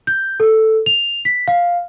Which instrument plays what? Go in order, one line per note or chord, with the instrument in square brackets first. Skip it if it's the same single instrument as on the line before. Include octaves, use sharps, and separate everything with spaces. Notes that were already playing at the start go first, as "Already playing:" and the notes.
[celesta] G6
A4
F7
B6
F5